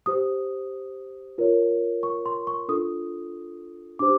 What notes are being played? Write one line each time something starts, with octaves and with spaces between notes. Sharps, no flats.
G4 C5 D#6
F4 A#4 C#5
C#6
C6
C#6
D4 F4 A4 D#6
D4 G4 C5 D6